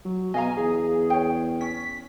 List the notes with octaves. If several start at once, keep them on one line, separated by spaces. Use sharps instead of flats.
F#3
B2 D#5 F5 G#5 A#5
E2 G#4
C#5 G5
C#4 B6